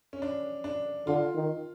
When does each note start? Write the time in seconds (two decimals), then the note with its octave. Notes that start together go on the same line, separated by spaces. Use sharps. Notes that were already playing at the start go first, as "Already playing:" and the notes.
0.13 C#4
0.22 D4
0.64 D4
1.07 D3 F4
1.36 D#3